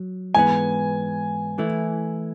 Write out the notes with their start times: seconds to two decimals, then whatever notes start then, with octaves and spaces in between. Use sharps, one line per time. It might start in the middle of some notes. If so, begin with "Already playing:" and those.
Already playing: F#3
0.35 G#2 E3 B3 G#5
1.58 E3 A3 E4